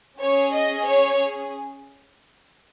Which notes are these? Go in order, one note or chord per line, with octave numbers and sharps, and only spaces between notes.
C#4 G#4 C#5
D#5
C#5